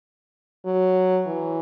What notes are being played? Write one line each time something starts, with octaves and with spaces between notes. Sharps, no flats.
F#3
E3